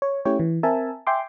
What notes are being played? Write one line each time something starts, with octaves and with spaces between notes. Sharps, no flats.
C#5
A3 C#4 E4 G4 C#5 G5
E3
C4 A#4 E5 G#5 A5
E5 G5 G#5 C6 D6